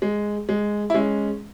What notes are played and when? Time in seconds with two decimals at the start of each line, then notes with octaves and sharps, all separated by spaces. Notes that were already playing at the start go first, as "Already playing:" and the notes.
0.02 G#3
0.49 G#3
0.90 E4
0.94 G#3 C#4